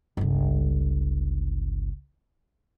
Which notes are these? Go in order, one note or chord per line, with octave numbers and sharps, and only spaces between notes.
G1 C#2